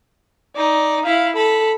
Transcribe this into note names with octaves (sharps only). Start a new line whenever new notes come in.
D#4 D5
E4 F5 B5
A4 B5